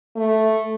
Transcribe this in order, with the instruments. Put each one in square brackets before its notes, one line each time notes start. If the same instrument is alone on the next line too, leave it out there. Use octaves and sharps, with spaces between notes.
[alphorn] A3